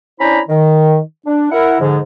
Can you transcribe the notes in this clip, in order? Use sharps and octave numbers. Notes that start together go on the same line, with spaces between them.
C#4 D4 E4 C5 A#5 B5
D#3
D4
E4 A#4 F#5
G#2 D3 F3